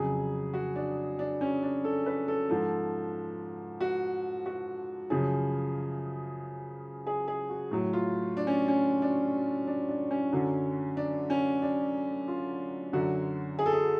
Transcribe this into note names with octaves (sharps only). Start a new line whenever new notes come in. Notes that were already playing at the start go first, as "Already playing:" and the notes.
Already playing: F2 C#3 F#3 G#4
F#4
D4
D4
C#4
D4
A4
B4
A4
G#2 F3 A4
F#4
F#4
F#2 C#3 F3 G#4
G#4
G#4
F#4
A2 F#3
F4
D4
C#4
C#4
D4
D4
D4
C#4
F#2 D3 F#3
D4
C#4
D4
F4
F#2 D3 F#3 F#4
G#4
A4
G#4